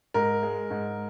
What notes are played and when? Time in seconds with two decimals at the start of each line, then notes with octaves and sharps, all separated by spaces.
0.14 G#2 A#4
0.43 G#3
0.70 G#2